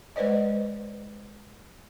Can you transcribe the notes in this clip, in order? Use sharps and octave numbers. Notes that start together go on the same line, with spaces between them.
G#3 B4 C5 D5 D#5